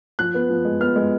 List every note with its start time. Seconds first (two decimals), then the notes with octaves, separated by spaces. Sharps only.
0.19 F3 F#6
0.34 B3
0.50 F3
0.65 G#3
0.81 B3 F6
0.96 G#3